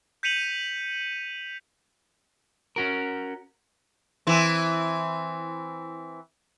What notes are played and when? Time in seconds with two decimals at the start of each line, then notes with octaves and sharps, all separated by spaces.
0.23 G6 B6 C#7 D#7 F7 F#7
2.76 C#4 F#4 A#4
4.27 E3 C4